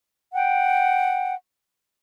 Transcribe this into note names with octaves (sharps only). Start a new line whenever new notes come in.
F#5 G5